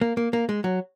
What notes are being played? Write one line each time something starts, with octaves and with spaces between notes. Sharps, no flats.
A#3
A#3
A#3
G#3
F#3